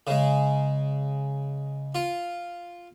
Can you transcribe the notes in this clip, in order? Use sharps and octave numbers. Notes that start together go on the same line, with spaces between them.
C#3 G#3
F4